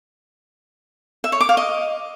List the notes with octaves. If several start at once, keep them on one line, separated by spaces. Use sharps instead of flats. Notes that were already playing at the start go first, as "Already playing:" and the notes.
E5
C#5
D6
F5
D#5